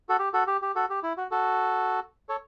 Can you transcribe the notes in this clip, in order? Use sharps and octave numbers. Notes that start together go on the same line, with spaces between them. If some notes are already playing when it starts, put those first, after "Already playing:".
F#4 A4
G4
F#4 A4
G4
G4
F#4 A4
G4
E4
F#4
F#4 A4
A4 C#5